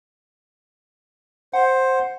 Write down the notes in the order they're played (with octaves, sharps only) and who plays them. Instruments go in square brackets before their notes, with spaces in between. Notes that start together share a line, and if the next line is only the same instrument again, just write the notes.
[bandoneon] C5 [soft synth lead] F#5